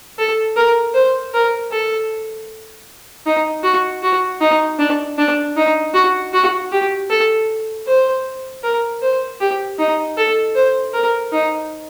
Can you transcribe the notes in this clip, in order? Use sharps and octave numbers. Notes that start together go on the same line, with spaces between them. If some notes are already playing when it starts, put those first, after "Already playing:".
A4
A#4
C5
A#4
A4
D#4
F#4
F#4
D#4
D4
D4
D#4
F#4
F#4
G4
A4
C5
A#4
C5
G4
D#4
A4
C5
A#4
D#4